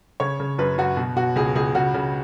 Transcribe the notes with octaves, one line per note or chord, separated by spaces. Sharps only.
C#3 C#5
C#3
F#2 B4
F#2 F#4
B2
B2 F#4
C#2 G#4
C#2 G#4
C#3 F#4
C#3